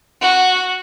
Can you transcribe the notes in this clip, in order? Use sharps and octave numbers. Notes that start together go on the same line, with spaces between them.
F#4